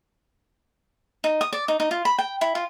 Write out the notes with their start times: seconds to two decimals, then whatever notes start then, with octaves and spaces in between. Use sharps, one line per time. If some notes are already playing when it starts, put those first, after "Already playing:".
1.24 D#4
1.41 D#6
1.53 D5
1.68 D#4
1.80 D#4
1.91 F4
2.05 B5
2.18 G5
2.41 E4
2.55 F4